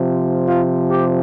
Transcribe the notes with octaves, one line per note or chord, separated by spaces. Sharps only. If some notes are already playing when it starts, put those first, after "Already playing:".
Already playing: C3 F3
F4
G4